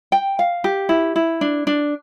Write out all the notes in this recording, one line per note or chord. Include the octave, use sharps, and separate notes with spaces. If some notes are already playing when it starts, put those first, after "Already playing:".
G5
F5
G4
E4
E4
D4
D4